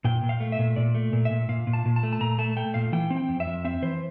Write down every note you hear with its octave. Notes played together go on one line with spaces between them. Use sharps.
A#2 G5
A#2
F5
A3
E5
A#2
A#2 D5
A3
A#2
E5
A#2
A#2 F5
A#2
A5
A#2
A5
A3
A5
A#2 A#5
A3 A5
A3 G5
A#2 F5
E3 G5
C4
G5
F2
E5
F2
C4 E5
E3 C5